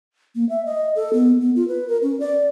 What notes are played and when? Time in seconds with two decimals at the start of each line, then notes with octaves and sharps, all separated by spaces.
0.35 A#3
0.49 E5
0.65 D#5
0.96 A4
1.13 B3
1.41 B3
1.56 F4
1.68 B4
1.88 A#4
2.03 C#4
2.20 D5